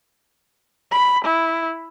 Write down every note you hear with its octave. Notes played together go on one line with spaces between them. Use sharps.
B5
E4